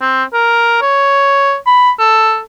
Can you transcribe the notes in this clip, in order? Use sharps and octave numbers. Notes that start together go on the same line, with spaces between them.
C4
A#4
C#5
B5
A4